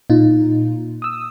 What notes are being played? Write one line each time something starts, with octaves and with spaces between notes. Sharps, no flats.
A#2 D#4 F4
D#6 E6